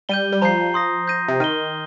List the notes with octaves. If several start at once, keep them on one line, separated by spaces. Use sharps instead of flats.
G3 G6 D#7 G7
G3
F3 A#5 G6 C7
C6 D#6 A#6
G6 A#6 D#7
C3
D#3 F6 D#7 G7